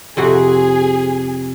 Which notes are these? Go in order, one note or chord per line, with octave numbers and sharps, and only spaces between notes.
F2 C3 F#4 G#4